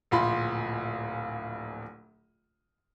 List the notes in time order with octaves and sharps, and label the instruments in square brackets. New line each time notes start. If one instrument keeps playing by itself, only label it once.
[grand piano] D1 A#1 F4 B5 C6